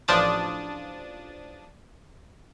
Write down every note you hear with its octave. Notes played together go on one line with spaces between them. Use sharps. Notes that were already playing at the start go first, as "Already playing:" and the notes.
A1 F3 D4 D#6 A6